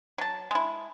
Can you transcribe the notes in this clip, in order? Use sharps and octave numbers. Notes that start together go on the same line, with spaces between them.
F#3 A5
G#3 E4